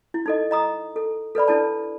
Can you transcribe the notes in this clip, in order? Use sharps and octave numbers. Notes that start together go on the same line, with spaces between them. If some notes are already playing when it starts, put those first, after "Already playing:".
E4
D#4 A4 D#5
D#5 A#5 D#6
A4
A4 B4 D5 B5
D4 E4 A4 D5 A5